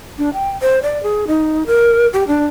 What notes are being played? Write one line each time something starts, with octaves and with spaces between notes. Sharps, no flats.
D4
G5
C5
D5
G#4
D#4
A#4
G4
D4